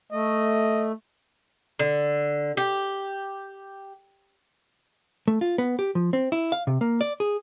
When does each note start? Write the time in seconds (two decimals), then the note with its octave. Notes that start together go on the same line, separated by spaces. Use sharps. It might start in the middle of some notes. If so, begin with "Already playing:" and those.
0.12 A3 D#5
1.79 D3
2.57 G4
5.28 A3
5.41 F4
5.58 B3
5.79 G4
5.95 F3
6.13 C4
6.32 E4
6.52 F5
6.67 C3
6.81 A#3
7.01 D5
7.20 G#4